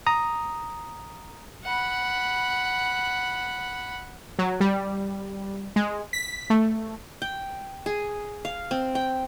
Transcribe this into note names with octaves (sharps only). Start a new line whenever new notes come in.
A#5 D#6
F#5 B5
F#3
G3
G#3
B6
A3
G5
G#4
F5
C4
G5